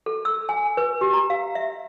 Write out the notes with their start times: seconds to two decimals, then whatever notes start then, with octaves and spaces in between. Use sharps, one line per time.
0.06 A4
0.25 E6
0.49 G#5
0.77 B4
1.01 G4
1.13 A#5
1.30 F5
1.55 E5